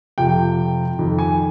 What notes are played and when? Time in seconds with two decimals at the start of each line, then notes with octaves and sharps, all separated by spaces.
0.18 F2 C3 F3 G5
0.99 F2 D#3
1.19 G#5